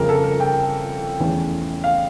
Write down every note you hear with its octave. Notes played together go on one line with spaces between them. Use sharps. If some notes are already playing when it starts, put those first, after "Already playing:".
Already playing: G1 F2 C#3 A#4
A4
A#4
G5
E2 E3 A3 C#4
F5